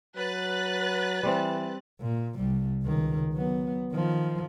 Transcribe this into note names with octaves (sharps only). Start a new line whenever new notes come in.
F#3 B4 F#6 A6
E3 G3 C4
A#2
C2 G3
C#2 D#3
F#3 B3
D#3 F3